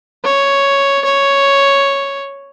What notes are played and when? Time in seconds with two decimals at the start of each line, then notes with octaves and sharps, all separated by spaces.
0.24 C#5
1.04 C#5